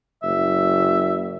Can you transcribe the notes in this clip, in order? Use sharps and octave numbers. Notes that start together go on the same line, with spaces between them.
F#1 E5